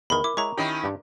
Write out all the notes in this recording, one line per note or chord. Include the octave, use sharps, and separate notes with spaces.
E2 D#3 A#4 B5
E4 D6
G#3 E4 C#5 A#5 C#6
D#3 C#4 E4 G4 D#5 G5
G2 D4 G4